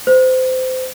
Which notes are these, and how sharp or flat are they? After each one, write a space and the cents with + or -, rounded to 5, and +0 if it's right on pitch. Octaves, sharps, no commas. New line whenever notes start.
C5 -25